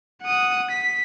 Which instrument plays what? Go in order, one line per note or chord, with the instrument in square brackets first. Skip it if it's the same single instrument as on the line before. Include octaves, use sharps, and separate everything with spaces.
[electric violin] F#5 D#6
B6